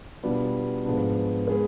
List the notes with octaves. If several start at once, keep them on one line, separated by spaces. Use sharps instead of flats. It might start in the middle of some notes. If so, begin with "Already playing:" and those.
B2 G3 B3 D4 F4
G#2 F3 G#3 B3 D4
G#3 B3 D#4 G#4 B4